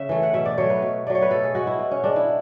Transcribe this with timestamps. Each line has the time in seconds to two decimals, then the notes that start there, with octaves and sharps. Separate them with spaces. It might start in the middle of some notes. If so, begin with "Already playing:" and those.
Already playing: C#3 E5
0.09 E3 A3
0.23 F#5
0.33 B2 E5
0.45 D5
0.58 F#3 A3 C#5
0.70 B4
0.82 B2
1.06 F#3 A3 D5
1.15 C#5
1.22 B4
1.31 B2 A4
1.43 G#4
1.55 G#3 B3 F#4
1.67 E4
1.79 B2
1.91 C#4
2.04 G#3 B3 D4
2.16 E4